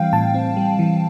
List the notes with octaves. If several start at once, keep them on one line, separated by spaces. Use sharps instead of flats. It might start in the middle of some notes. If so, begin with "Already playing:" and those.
Already playing: E3 G3 C4 F5 G5
A2 A5
C4
G3
E3